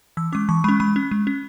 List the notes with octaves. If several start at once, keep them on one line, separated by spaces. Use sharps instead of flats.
E3 E6
G#3 C#4 D6
E3 C#6
G#3 C#4 B5
G#3 B5
C#4
G#3
C#4